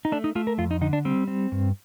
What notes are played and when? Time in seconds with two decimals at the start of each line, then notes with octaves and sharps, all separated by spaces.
0.05 D#4
0.12 A3 D4
0.24 D#4
0.35 A3 F4
0.47 A#4
0.58 F2 F4
0.71 D#4
0.81 D3 D#4
0.93 D4
1.05 G3 C4
1.28 C4
1.52 G2